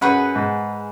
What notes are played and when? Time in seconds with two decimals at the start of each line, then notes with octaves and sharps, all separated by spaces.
0.01 F#2 G#4 B4 F#5
0.36 G#2